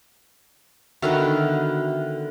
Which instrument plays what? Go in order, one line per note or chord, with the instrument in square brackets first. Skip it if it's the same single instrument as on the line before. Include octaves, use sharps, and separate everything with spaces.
[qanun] D3 D#3 B3 [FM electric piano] F#4 E5 F6